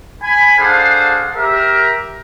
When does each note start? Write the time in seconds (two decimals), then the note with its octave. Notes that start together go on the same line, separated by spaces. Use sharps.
0.23 G#5 B5
0.59 D4 G#4 A4 C5 F5 F#5
1.36 G4 A#4 E5